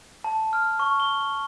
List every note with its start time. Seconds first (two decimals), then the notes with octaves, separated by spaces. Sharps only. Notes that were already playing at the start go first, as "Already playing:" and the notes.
0.24 A5
0.53 F6
0.79 C#6
1.00 G7